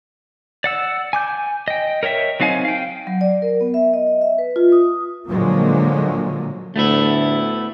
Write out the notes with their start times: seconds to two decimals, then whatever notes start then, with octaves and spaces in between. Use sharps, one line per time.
0.64 D5 F#5 E6
1.13 G#5 D6 G6
1.68 D#5 G5
2.03 A#4 C#5 D#5 E5 G5
2.40 F#3 C4 D#4 F5 G#5
2.65 F5 G5
3.07 F#3
3.21 D5
3.42 A#4
3.61 B3
3.74 E5
3.94 D#5
4.07 D#5
4.21 E5
4.38 B4
4.56 F4
4.72 D#6
5.27 A#2 D3 F3 F#3 G#3 A#3
6.76 D2 A3 B3 E4